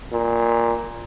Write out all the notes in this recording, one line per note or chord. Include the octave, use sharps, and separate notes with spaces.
A#2